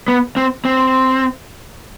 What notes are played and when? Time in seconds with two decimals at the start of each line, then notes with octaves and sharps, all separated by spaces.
0.08 B3
0.37 C4
0.65 C4